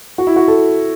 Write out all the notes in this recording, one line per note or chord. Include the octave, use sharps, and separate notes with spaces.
F#4
E4
F#4
A4